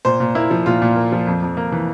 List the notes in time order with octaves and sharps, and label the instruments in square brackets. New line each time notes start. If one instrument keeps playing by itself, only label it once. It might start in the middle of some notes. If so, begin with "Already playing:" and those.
[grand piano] A#2 C5
A#2
A#3 E4
F3
A#2 F4
A#2
A#3
F3
F2
F2
A#3
E3